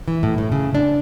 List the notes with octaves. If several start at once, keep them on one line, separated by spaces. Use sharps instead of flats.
E3
A2
A2
C#3
D4